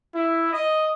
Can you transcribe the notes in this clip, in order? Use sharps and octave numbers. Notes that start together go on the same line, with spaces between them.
E4
D#5